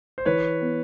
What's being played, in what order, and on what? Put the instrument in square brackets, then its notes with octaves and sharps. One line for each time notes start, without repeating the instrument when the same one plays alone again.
[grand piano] C5
[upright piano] E3 [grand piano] B4 C#5
[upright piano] B3